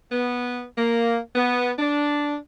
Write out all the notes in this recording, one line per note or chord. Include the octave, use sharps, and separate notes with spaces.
B3
A#3
B3
D4